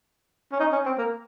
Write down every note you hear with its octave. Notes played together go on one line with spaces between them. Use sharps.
C#4
D#4
C#4
C4
A#3